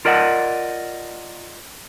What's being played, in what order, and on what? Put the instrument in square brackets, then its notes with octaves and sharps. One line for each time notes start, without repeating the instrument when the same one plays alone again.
[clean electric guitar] F4 A#4 D5 D#5 F#5